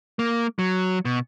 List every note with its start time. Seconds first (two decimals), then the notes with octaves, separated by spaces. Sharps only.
0.19 A#3
0.59 F#3
1.05 B2